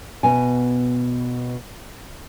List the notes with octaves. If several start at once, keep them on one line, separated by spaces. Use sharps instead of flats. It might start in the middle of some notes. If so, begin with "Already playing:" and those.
B2 G#5